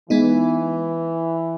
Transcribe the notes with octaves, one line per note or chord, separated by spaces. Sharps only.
E3 G#3 B3 D#4